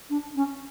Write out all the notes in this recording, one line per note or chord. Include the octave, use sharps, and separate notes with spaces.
D4
C#4